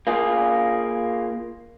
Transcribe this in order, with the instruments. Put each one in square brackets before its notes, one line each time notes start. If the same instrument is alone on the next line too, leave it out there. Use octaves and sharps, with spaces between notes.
[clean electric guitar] A#3 F4 G#4